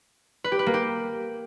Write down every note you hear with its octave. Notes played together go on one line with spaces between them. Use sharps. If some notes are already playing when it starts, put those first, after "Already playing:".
B4
G4
B4
A#3
G4